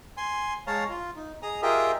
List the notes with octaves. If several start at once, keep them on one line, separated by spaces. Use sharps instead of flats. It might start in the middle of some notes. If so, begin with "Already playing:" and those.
G#5 C6
G#3 C#5 F5 A5 A#5
F4
D#4
G#4 D#5 A#5 D#6
F4 G4 G#4 A#4 D#5 E5